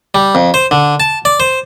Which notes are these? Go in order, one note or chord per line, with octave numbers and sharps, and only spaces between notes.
G3
F2
C5
D3
A5
D5
C5